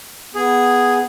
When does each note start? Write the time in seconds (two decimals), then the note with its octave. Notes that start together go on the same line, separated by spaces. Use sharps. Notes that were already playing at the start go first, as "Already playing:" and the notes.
0.35 B3 G#4